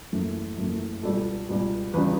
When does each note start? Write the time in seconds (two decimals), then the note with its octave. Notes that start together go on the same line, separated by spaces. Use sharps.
0.12 F#1 F#2 E3 A3
0.57 F#1 F#2 E3 A3
1.03 C#2 B2 G3 A4
1.49 C#2 B2 G3
1.93 E2 C#3 G3 B4